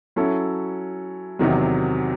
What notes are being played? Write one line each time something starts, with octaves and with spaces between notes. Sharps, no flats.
F#3 C#4 E4 A4
E2 C3 D#3 F#3